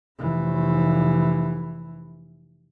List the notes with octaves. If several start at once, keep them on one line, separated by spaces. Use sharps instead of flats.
F1 E3